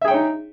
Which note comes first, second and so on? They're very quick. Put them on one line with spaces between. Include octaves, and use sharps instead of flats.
E5 G#4 G5 C#5 D#4